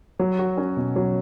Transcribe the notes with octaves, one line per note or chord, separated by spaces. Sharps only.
F#3
F#4
C#4
B2
F#3